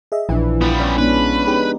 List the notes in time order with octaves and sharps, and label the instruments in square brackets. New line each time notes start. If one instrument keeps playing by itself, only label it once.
[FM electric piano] G#4 D#5 E5
[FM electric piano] A#1 E4 E5 [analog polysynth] E3 [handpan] F3 D4
[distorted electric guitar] G3 B3 [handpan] F4
[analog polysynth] C#4 [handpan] D5
[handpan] G#3 B3 D4 [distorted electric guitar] B4
[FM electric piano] B3 G4 G#4 [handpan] D#4